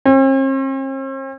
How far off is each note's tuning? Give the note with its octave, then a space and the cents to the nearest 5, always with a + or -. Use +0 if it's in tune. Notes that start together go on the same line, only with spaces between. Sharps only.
C4 +45